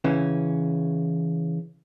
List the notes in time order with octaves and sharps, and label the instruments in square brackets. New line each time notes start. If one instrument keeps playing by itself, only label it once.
[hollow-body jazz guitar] C#3 E3 C#4